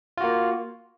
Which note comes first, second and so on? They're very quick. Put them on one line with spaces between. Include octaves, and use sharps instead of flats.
F4 F#4 A#3